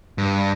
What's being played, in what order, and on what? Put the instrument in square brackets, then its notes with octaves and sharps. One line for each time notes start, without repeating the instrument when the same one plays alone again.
[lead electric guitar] G2